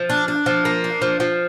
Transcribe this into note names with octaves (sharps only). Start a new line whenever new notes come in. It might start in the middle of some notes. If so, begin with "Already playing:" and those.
Already playing: F3
D4
D4
F3
A#3
D4
F3
F3